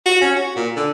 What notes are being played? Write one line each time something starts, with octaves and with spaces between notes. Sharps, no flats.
F#4
C#4
F#4
A#2
D3